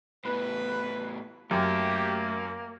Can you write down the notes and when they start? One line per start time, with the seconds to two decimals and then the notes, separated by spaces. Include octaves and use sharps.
0.25 A2 B3 B4
1.51 F#2 A3 A#3 G4 E5